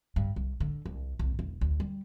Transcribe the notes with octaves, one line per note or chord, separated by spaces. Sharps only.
G2
C2
D3
C2
C2
E1
D2
G3